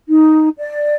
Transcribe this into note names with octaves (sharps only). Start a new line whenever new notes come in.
D#4
D5